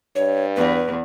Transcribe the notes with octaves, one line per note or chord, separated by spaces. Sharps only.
G2 C#5
E2 B4